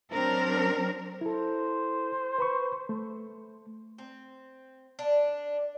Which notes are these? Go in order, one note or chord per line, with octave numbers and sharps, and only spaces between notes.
F#3 C4 D4 A#4
E4 A4 C5
B4 B5 C#6
A3
C4
D4